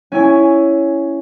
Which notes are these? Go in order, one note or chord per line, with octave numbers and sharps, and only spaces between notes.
C#4 E4 G#5